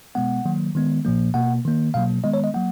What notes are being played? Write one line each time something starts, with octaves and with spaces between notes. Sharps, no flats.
B2 G#3 B3 F#5
D#3 F#3 A#3
D#3 G#3 B3
A#2 F3 A#3
B2 A#3 F#5
D#3 A#3
B2 F#3 A#3 F5
D#3 G#3 B3 D#5
C#5
D#5
F#3 A#3 F#5